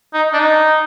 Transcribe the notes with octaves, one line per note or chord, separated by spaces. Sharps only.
D#4
D4
D#4